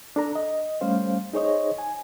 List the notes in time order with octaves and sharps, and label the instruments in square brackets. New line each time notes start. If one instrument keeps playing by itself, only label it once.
[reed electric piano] D4 A4 A#5
D#5
G3 A3 C#4 C5 F5
D#4 G#4 C5 C#5 D#5
G#5